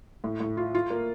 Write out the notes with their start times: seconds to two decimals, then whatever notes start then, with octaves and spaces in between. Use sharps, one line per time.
0.24 A2
0.40 A2
0.57 F4
0.75 F4
0.91 A#3